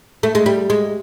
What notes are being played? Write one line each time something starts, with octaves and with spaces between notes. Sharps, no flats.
A3
G#3
G3
G#3